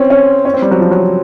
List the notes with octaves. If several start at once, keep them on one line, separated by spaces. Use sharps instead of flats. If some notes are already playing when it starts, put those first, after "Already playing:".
Already playing: C4 C#4
C#4
C#4
C4
G3
F#3
F3
F#3